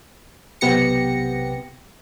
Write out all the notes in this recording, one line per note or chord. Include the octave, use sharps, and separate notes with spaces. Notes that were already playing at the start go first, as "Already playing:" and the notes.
B1 C3 B3 G4 A#6 C#7